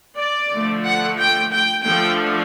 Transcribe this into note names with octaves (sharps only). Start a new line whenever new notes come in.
D5
D3 F3 A3
F#5
G5
G5
D3 F3 A3 G5